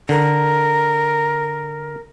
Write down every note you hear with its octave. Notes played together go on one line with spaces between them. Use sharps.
D3 A#4